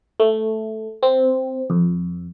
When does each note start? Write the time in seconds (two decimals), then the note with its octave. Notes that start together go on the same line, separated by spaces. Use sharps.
0.20 A3
1.03 C4
1.70 F2